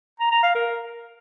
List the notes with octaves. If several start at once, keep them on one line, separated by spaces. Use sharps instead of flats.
A#5
A#5
F5
A#4